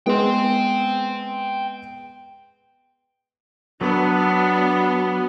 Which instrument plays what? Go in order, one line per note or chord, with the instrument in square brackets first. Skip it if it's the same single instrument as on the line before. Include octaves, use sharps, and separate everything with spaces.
[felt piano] G#3 B3 [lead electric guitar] G5 C6
[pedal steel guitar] F#3 [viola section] B3 [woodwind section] D4